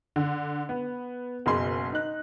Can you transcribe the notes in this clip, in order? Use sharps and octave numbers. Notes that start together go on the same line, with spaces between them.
D3
B3
F#1 B2 G#4 C6
D#4 F#6